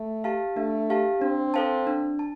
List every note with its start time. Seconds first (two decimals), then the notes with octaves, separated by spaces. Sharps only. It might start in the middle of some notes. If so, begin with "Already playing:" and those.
Already playing: A3
0.24 G4 F5 A5
0.57 A3 D4
0.90 G4 F5 A5
1.22 C4 D4
1.54 A4 C5 F5 A5
1.87 D4
2.19 A5